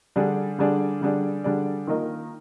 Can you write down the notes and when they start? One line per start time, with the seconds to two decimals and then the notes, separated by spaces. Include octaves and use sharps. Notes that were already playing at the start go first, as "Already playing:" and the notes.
0.16 D3 G3 D4 G#4 D5
0.59 D3 G3 D4 G#4 D5
1.01 D3 G3 D4 G#4 D5
1.44 D3 G3 D4 G#4 D5
1.87 D#3 A#3 F4 A#4 D#5